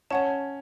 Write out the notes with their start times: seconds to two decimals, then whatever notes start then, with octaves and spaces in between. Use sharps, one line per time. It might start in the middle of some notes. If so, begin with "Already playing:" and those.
0.10 C#4 C#5 F#5 A5